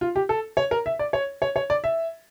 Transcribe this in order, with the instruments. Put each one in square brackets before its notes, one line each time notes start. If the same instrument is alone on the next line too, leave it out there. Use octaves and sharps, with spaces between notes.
[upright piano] F4
G4
A4
C#5
A#4
E5
D5
C#5
C#5
C#5
D5
E5